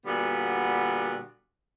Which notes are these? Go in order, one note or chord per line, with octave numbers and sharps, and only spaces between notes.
A#2 D3 G3 B3 F#4